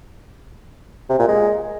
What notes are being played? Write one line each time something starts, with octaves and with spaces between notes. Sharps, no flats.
C3
A#2
G#3